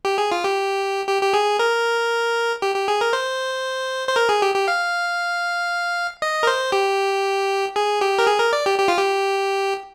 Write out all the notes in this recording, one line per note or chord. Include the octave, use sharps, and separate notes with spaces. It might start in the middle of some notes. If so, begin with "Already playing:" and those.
G4
G#4
F4
G4
G4
G4
G#4
A#4
G4
G4
G#4
A#4
C5
C5
A#4
G#4
G4
G4
F5
D#5
A#4
C5
G4
G#4
G4
A#4
G#4
A#4
D5
G4
G4
F4
G4